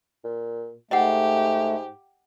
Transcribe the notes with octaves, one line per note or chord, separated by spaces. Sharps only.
A#2
G#2 A3 G4 D#5 F#5